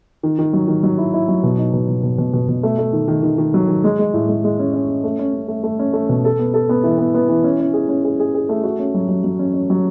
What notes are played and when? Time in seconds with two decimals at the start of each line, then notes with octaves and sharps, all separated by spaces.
0.23 D#3
0.39 D#3
0.53 F#3
0.68 D#3
0.83 F#3
0.98 E4
1.13 E4
1.28 F#3
1.44 B2
1.58 D#4
1.73 B2
1.88 B2
2.03 B2
2.18 B2
2.33 B2
2.48 B2
2.63 A3
2.79 A3
2.93 D#3
3.08 D#3
3.23 D#3
3.38 D#3
3.54 F#3
3.68 D#3
3.84 G#3
3.99 G#3
4.14 A2
4.29 G#3
4.44 G#3
4.59 C#4
4.73 C#4
4.88 C#4
5.04 A3
5.19 C#4
5.33 C#4
5.48 A3
5.64 A3
5.79 C#4
5.93 A3
6.09 B2
6.24 A4
6.39 B3
6.54 A4
6.69 B3
6.84 E3
6.98 B3
7.14 B3
7.29 E3
7.44 C#4
7.60 C#4
7.73 G#4
7.89 C#4
8.04 G#4
8.20 G#4
8.34 G#4
8.49 A3
8.64 F#4
8.79 C#4
8.95 F#3
9.09 F#3
9.24 F#3
9.39 C#4
9.54 C#4
9.70 F#3